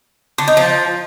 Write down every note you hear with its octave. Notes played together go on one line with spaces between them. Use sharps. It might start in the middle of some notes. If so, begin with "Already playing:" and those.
D3
D#4
F3